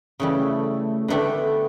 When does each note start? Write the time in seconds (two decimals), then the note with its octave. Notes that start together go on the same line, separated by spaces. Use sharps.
0.20 C#3 E3 G3 A3
1.08 D3 A3 B3 D4 G4